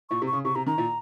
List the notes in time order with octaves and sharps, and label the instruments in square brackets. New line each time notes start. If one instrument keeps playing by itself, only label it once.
[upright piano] A#2 [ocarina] C#6
[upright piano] C3
[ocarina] C#6
[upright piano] C#3
[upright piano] C3 [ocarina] C#6
[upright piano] C3 [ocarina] A#5
[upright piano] D#3 [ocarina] A#5
[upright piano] A#2